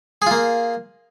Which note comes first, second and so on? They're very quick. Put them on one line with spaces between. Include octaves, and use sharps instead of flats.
G#4 F4 A#3